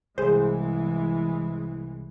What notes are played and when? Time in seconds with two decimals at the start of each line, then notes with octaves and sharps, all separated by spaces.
0.18 C2 E3 G#3 G#4 C5